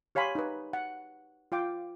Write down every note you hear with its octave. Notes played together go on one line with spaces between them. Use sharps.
G4 C#5 F5 G#5 B5 C6
D#4 B4
F#5
F4 F5 G5 D6